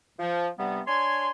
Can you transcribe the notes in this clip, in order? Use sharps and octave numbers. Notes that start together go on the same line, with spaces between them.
F3
G2 C3 G3 B3
D4 C#5 G#5 C6